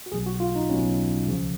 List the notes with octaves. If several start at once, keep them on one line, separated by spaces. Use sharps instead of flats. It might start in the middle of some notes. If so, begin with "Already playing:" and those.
F#4
B1 B2 F#3 G#4
F#4
F4
D#4
B1 B2 F#3 C#4
C#2 C#3 F3